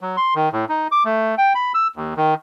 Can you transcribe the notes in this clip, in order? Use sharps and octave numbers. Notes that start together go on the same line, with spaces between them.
F#3
C6
D#3
A2
D#4
D6
A3
G5
B5
E6
D#2
D#3